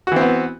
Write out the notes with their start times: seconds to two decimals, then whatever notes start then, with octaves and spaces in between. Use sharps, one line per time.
0.07 F#4
0.12 E3
0.16 C4
0.21 B3